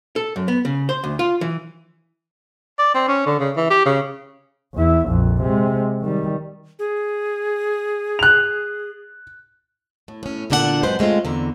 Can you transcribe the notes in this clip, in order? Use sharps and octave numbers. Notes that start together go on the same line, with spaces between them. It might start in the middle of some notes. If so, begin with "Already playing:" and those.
A4
F#2
B3
C#3
C5
D2
F4
E3
D5
C4
C#4
D3
C#3
E3
G4
C#3
E2 E4
A#1 F2
C3 G#3
D#3 G3
G#4
F#6 F7
A2
A2 C#4
E2 A#2 D3 D4 F#4 F#5
F#2 G#3 C4 B4 C5 F#5
C#3 G#3 A3 C4 F4
E2 D3 C4 A#5